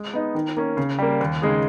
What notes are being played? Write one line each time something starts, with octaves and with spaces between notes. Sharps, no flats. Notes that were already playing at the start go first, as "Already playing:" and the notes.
Already playing: G#3
B3 D#4
D#3
A#3 C#4
C#3
G3 A#3
D#2
C#3 G#3 D#4 G#4